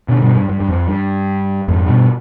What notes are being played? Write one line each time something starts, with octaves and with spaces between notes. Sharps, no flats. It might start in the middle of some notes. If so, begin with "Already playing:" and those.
B2 D3
G2 B2
G2
G2
G2
F2
G2
F2 G#2
G2 B2